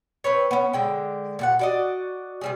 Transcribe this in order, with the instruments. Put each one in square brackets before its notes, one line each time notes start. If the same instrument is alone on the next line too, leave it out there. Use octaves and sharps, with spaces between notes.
[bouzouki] C4 B4 C#5
B3 C#4
D3 G#3 G5
A#2 G4 F#5
F#4 D5 D#5
C3 G3 G#4